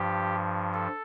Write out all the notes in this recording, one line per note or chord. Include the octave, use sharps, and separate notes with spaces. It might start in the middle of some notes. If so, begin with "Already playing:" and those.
Already playing: G2 F3 G4
A4